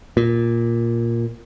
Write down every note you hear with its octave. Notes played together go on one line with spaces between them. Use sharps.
A#2